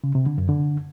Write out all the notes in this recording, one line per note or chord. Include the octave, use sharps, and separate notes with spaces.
C#3
C3
D3
F#2
D3